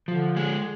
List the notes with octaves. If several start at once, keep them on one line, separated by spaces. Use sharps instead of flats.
D3 F3
G#3